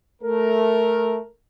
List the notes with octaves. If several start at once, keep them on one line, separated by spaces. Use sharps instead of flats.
A3 A#4